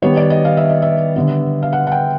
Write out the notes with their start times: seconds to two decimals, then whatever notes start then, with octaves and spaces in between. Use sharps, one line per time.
0.02 D#3 G3 B3 C#5
0.17 D5
0.30 D#5
0.45 F5
0.57 E5
0.69 D#5
0.82 E5
1.16 D3 G3 B3
1.62 F5
1.73 F#5
1.87 F#5
1.92 G5